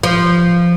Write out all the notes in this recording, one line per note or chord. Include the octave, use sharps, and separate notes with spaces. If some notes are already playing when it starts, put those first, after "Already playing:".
F3